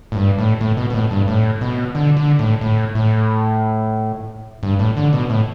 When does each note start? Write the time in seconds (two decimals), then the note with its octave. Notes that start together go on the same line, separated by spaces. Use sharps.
0.12 A2
0.16 G2
0.38 A2
0.61 A2
0.77 B2
0.90 B2
0.94 A2
1.11 G2
1.28 A2
1.61 B2
1.95 D3
2.17 D3
2.39 A2
2.61 A2
2.95 A2
4.63 G2
4.79 A2
4.97 D3
5.13 B2
5.30 A2